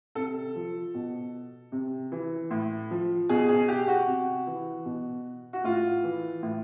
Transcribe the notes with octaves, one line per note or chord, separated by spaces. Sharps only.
C3 A4
F3
B2
C3
E3
A2
F3
B2 G#4
G#4
G4
F#4
C3
E3
B2
F#4
A2 F4
E3
A2